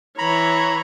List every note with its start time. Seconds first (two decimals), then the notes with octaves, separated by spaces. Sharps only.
0.18 E3 C#5 A#5 B5